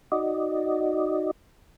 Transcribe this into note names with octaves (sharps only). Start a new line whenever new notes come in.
D#4 F#4 D5 D#5